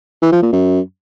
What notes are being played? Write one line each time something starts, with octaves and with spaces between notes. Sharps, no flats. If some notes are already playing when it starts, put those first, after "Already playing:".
E3
F3
A#2
F#2